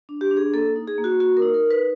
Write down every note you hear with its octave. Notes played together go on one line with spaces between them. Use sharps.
D4
G4
D4
G#4
A#3 A4
D#4
G#4
A#3
F#4
A#3 F#4
A#4
D#4
A#4
D#4
B4